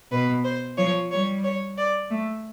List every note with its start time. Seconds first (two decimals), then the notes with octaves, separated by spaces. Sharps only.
0.12 B2 B4
0.44 C5
0.77 F3 C#5
1.11 G3 C#5
1.44 C#5
1.78 D5
2.10 A3